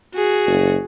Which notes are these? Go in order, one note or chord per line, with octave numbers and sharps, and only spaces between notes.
F#4 G#4
F#1